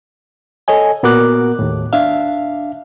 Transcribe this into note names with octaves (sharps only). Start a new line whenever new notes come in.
A4 C#5 D#5 G#5
A#2 B3 F#4 A#4 D6 F#6
D#2 A2
D4 E5 F5